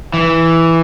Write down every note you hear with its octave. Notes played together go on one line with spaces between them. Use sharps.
E3